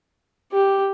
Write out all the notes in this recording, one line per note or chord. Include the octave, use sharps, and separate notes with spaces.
G4